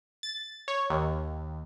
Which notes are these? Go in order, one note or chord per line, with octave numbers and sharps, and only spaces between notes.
A6
C#5
D#2